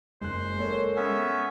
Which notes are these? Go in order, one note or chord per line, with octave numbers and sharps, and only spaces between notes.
F#1 G#3 C5 F#6
A#3 A4 C#5
B3 C#4 E5